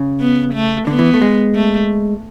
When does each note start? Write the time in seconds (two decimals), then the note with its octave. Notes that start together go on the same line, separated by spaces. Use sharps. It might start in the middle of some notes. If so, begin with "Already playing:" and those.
Already playing: C#3
0.20 B3
0.54 A3
0.87 D3 B3
0.99 E3
1.14 A3
1.22 G#3
1.55 A3